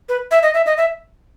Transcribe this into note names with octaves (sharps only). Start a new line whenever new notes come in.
B4
E5
D#5
E5
D#5
E5